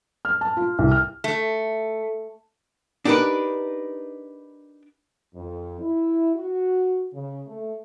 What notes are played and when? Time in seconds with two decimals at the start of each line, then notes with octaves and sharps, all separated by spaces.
0.25 F6
0.41 A5
0.57 F4
0.79 C2
0.91 F6
1.24 A3
3.05 D4 D#4 G4 A#4 B4
5.35 F2
5.81 E4
6.35 F#4
7.13 C#3
7.47 A3